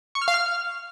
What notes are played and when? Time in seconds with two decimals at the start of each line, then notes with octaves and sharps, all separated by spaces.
0.15 C#6
0.21 F6
0.28 F5
0.34 F6